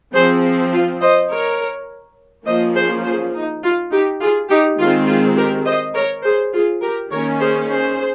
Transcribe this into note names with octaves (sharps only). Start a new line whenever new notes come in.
F3 C4 G#4 C5
F4
C5 D#5
A#4 C#5
F3 A#3 C#4 C5 D#5
G#4 C5
G#4 C5
D#4
F4
D#4 G4
F4 G#4
D#4 G4
D#3 G#3 C4 F4
F4
G4 A#4
C5 D#5
A#4 C#5
G#4 C5
F4 G#4
G4 A#4
D#3 A#3 C#4 A#4 C#5
G#4 C5
G#4 C5